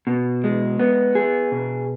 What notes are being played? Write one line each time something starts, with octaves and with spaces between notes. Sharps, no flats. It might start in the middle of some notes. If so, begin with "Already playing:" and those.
B2
G#3
B3
G#4
B2